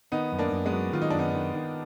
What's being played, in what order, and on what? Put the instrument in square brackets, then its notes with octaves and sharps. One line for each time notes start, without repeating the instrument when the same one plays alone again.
[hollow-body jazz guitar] D#3 [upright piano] B3 D#4
[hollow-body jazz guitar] F#2
[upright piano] A#3 D4
[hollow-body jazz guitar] F#2
[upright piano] G#3 B3
[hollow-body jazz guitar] F#3
[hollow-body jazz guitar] D#3 [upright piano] F4
[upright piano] D#4
[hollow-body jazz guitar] F#2 [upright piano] D4
[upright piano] B3 D#4
[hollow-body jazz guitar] D#3
D#3